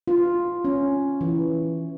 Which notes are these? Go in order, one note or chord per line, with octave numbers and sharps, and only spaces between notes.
F4
C#4
E3